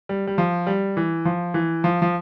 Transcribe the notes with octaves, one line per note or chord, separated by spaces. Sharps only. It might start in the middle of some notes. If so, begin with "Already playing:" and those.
G3
G3
F3
G3
E3
F3
E3
F3
F3